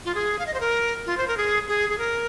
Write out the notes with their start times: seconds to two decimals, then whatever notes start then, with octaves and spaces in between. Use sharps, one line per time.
0.05 F4
0.15 G#4
0.39 F5
0.47 D#5
0.54 C5
0.60 A#4
1.06 F4
1.17 C5
1.28 A#4
1.37 G#4
1.68 G#4
1.89 G#4
1.98 A#4